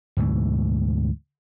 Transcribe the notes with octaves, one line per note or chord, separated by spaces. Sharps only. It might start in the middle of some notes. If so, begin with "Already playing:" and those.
D2 G#2 B2 E3